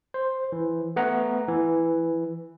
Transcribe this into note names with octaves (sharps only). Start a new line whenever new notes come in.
C5
E3
A3 B3 F#5 A#5
E3